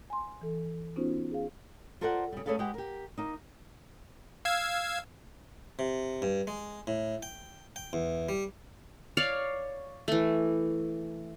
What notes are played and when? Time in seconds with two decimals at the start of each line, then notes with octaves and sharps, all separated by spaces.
0.10 G#5 C6
0.41 E3 A4
0.96 B3 C#4 D#4 F4 F#4 C5
1.31 G#4 F5
2.01 F4 A4 A#4 C5 D5 F#5
2.32 C#3 G3
2.46 A3 C#4 G#4 A4 B4 F5
2.59 G#3 G4 B4 F#5 G5
2.74 G4 A#4
3.18 A#3 D#4
4.45 F5 E6 G#6
5.79 C3
6.22 G2
6.47 G#3
6.87 A2
7.23 G5
7.76 G5
7.93 E2
8.29 G3
9.17 C#5 D5 F5
10.08 E3 A3